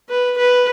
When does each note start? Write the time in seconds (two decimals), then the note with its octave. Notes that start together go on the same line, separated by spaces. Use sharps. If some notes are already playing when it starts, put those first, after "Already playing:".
0.10 B4
0.38 B4